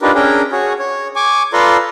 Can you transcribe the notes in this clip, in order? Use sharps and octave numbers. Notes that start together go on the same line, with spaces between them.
D4 D#4 F4 G4 A#4 B4
C#4 D4 G#4 A#4 G5
F#4 G#4 C#5
C#5
G#5 C#6 D6
F4 A4 B4 D5 A#5 C6